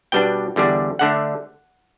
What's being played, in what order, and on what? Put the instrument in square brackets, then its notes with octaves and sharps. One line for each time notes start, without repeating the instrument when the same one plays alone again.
[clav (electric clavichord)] B2 G3 B3 D4 G5
E2 D3 G3 D4
D3 A3 D4 F#5